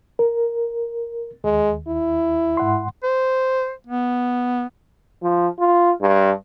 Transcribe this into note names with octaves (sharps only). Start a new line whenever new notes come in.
A#4
D#2 G#3
E4
G#2 F#5 C6
C5
B3
F3
F4
G2